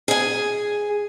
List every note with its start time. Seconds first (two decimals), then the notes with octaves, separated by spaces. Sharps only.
0.08 G#4 G#5